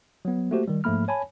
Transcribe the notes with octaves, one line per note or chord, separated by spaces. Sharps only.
F#3 B3
A3 A#3 F#4 G4 C5
D#3 G3
G#2 F3 A3 A#3 B5 F6
C#5 G#5 A5 B5